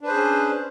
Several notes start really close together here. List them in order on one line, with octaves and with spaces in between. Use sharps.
D4 B4 C5 G#4 C#4